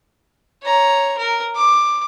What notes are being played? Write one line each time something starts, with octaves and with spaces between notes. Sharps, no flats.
C#5 A#5
A#4
D6